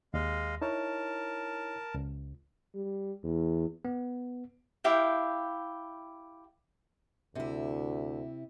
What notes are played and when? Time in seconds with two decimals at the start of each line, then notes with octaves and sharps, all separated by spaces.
0.14 D#2 G#3 D#5 F5
0.62 D#4 E4 A#4 C#5 A5
1.94 C#2
2.75 G3
3.24 E2
3.85 B3
4.84 E4 G4 F5 G5
7.35 D2 C3 E4